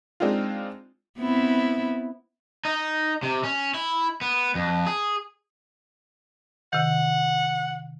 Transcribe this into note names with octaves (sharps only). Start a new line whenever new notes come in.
G#3 C4 D4 D#4 F4
B3 C4 E4
D#4
C3
C#4
E4
B3
F2
G#4
C3 D#3 F#5